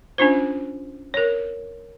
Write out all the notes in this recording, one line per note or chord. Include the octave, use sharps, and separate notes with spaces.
C#4 D4 F4 C5
A#4 C#5